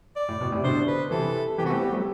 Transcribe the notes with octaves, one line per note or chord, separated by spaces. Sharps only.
D5
A2
B2
A2 C3
B2 D3 C5
B4
C3 E3 A4
C3 E3 G4
B3 F#4
A3 C4
G4
G3 B3
F#3 A3